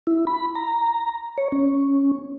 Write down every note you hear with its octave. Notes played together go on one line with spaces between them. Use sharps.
E4
B5
A#5
C#5
C#4